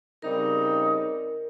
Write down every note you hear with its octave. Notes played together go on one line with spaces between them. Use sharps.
C#3 G3 C4 D#4 A#4